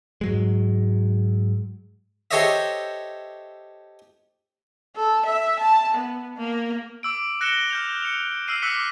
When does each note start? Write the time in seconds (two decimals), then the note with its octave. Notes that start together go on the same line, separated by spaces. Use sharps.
0.21 G#2 F#3 G#3
2.31 G4 A4 C5 C#5 D#5 E5
4.96 A4
5.25 E5
5.59 A5
5.94 B3
6.37 A#3
7.03 D6 E6 D7
7.41 F#6 A#6 C#7 D7 E7 G7
7.70 F6 G6 F7
8.03 C#7 F7
8.48 E6 F6 C7 D#7
8.62 D6 E6 F#6 B6 C#7